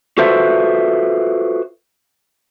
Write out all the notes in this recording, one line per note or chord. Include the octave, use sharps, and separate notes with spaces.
F4 F#4 A4 B4 C5 E5